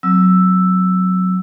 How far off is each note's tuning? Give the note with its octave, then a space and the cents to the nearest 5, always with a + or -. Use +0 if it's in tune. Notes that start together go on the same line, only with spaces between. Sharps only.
F#3 +0 C4 +0 E6 +0